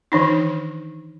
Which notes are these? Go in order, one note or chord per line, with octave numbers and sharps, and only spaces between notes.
D#3 E3 D4 D#4